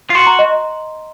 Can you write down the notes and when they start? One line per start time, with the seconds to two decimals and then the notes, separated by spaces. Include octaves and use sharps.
0.10 F4
0.15 F#4 C6
0.26 A#5
0.39 D#5